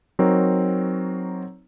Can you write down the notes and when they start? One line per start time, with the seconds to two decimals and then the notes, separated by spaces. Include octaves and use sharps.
0.19 F#3 C4 D#4 A#4 C#5